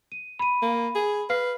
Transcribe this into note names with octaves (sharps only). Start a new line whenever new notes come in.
D#7
B5 D#7
A#3
G#4
B4 F5 F6 C7